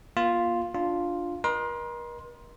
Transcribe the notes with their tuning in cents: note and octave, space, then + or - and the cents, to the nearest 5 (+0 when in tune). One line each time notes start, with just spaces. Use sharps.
A#3 +45 F4 +0
D4 +0 F4 +0
A#4 +40 D#5 -20 C6 +5